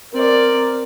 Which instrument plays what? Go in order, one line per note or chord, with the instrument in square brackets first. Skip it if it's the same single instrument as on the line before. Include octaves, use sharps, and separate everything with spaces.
[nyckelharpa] C4 D5 [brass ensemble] A#4